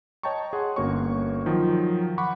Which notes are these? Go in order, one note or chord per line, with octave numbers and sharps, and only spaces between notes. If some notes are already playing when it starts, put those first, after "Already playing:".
C#5 D#5 G5 A5 A#5 C#6
G#4 F#5 C6
G1 A#3 C#4 F#4 C#5 C#6
D#3 F3 F#3
F#5 B5 C#6 D6